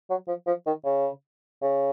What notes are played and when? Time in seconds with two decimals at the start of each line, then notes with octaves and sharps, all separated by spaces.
0.10 F#3
0.28 F3
0.47 F3
0.66 D#3
0.85 C#3
1.62 C#3